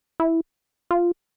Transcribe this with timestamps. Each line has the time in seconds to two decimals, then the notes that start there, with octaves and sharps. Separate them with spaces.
0.20 E4
0.91 F4